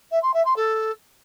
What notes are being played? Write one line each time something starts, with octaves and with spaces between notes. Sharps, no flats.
E5
C6
E5
C6
A4